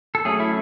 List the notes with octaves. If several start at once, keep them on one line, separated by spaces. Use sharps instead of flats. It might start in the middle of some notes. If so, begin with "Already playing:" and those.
A4
F#3 A3 C#4 G#4
E4